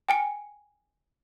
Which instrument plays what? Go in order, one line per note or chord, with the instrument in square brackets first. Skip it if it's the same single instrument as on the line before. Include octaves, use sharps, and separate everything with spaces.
[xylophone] G5 G#5 C#7